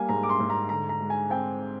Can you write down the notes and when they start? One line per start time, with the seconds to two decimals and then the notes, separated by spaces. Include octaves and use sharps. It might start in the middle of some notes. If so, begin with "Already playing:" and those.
Already playing: G3 A#3 G#5
0.09 G#2 A#5
0.23 D6
0.29 C6
0.40 G#2
0.50 A#5
0.69 D3 A#5
0.89 A#5
1.01 G#3
1.10 G#5
1.30 C4 G5